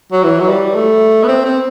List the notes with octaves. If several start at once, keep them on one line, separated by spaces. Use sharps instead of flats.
F#3
E3
F#3
G3
A3
B3
C4
C4